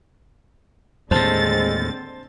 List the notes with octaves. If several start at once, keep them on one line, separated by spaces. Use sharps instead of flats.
D#2 A2 D3 G#3 C4 C5 A5 A6